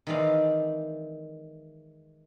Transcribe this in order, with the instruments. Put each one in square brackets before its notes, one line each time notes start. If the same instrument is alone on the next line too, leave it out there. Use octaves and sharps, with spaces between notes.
[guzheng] D#3 E3 G#3 C4 D5 F5